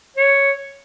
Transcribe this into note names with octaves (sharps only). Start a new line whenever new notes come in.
C#5